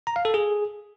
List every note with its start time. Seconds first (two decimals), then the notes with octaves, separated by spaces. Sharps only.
0.07 A#5
0.16 F5
0.25 A4
0.34 G#4